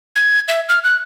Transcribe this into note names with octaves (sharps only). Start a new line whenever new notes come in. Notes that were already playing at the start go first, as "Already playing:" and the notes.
G#6
E5
F6
F#6